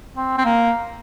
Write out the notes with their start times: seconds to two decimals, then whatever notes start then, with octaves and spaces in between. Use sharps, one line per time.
0.17 C4
0.38 C4
0.45 A#3